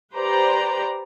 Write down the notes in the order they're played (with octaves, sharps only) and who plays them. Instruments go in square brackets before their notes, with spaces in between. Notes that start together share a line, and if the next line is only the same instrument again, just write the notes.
[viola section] G4 B4 C5 D5 A#5